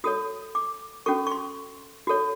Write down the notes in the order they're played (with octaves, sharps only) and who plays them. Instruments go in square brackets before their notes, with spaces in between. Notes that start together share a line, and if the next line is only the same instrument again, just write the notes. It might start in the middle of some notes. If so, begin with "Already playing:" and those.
[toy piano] F#4 A4 C#5 D#6
D6
C#4 F#4 A4 C#6
C#6
C6
F#4 A4 C#5